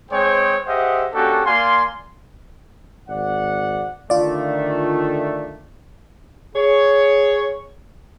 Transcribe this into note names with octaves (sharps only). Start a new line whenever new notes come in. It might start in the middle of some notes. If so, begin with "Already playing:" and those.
G#3 C4 G#4 C5 C#5 G5
G4 G#4 C5 D#5 E5 F#5
A#3 C#4 D4 F#4 G4 A4
A#3 D5 F5 G#5 C6
G#1 D5 F#5
D3 D#3 A3 F4 D5
G#4 C#5